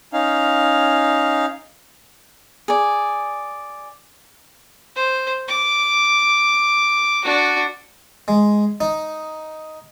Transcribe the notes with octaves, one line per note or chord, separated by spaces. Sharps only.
C#4 D#4 F5
G#4 D5
C5
D6
D4 F#4
G#3
D#4